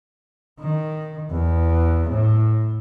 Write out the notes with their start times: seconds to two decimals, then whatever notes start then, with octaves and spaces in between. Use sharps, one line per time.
0.60 D#3
1.31 E2
2.10 A2